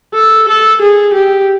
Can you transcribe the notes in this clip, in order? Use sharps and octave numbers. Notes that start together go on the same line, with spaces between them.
A4
A4
G#4
G4